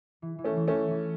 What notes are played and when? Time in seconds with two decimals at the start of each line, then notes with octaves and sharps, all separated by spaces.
0.22 E3
0.39 E3
0.44 A3 C#4
0.56 E3
0.68 A3 C#4
0.73 E3
0.91 E3